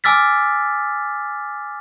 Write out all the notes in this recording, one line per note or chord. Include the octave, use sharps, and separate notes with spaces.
G#5 D6 E6 F6 A6 B6